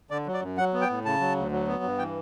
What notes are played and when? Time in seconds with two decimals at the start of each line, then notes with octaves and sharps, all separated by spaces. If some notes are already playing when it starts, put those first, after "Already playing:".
0.11 D3 D5
0.26 F#3
0.34 D5
0.42 F#2
0.57 F#3 F#5
0.74 B3
0.81 G5
0.89 A2
1.05 C#3 A5
1.20 F#3
1.37 D2
1.51 F#3
1.68 B3
1.83 G2
1.99 E3 G5